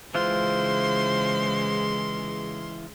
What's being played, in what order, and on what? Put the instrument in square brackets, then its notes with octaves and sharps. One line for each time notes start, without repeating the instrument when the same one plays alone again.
[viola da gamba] C#3 G#3 [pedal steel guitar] E3 F4 [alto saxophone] C5 [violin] C6